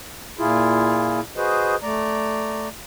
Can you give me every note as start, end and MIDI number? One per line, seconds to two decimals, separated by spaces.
0.39 1.20 46
0.39 1.20 64
0.39 1.20 65
0.39 1.20 68
1.37 1.76 66
1.37 1.76 68
1.37 1.76 71
1.37 1.76 72
1.37 1.76 75
1.83 2.69 57
1.83 2.69 74
1.83 2.69 82